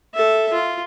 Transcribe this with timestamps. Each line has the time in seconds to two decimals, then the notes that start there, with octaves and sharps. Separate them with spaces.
0.14 A4 E5
0.53 F4